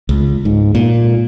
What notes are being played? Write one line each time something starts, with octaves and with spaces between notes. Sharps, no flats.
C#2
G#2
A#2